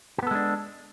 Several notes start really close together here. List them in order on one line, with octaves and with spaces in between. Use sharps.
G4 B3 A4 G#3 D4